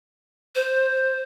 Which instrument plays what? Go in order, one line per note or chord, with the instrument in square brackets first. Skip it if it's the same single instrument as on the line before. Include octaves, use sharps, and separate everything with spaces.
[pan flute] C5